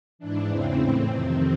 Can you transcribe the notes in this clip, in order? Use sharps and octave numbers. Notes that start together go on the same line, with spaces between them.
G#2 E3 D4
E2 C#3 E3 C4
A2 E3 C4
F2 C3 D#3 C4